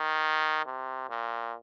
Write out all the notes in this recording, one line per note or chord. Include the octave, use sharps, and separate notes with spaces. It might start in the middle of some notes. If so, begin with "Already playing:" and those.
Already playing: D#3
C3
A#2